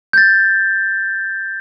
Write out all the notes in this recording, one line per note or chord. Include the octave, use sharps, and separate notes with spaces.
G6 A6